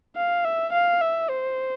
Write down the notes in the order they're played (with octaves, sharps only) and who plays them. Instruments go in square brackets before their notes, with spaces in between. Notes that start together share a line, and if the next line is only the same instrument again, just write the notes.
[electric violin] F5
E5
F5
E5
C5